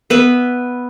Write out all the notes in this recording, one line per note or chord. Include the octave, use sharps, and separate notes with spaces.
B3 B4 E5